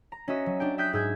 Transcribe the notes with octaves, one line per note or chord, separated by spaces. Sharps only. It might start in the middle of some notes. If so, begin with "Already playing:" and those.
A#5
C#4 F#4 D#5 E5
F#3
D4 G4 G5
E5 G5 D#6 F#6 G6 B6
G#2 G#4 E6 G6 G#6